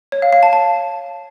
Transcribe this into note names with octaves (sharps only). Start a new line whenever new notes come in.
C#5
F5
F5
A5
A5